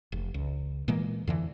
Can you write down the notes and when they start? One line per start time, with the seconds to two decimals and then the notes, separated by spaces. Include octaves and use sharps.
0.12 F1
0.34 C#2
0.88 A#2 E3 G#3 A#3
1.27 F2 D3 E3